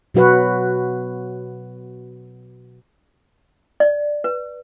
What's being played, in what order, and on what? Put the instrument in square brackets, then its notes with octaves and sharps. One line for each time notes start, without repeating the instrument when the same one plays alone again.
[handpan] B2 F#3 F#4 B4 F#5
[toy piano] D5
B4